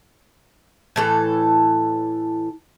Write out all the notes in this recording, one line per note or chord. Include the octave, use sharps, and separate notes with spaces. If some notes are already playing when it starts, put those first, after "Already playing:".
A2 E3 A4